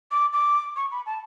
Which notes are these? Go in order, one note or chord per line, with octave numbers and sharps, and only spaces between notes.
D6
D6
C#6
B5
A5